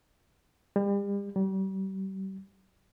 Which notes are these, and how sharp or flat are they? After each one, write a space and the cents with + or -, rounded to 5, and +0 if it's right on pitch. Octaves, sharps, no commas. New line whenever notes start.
G3 +40
G3 -35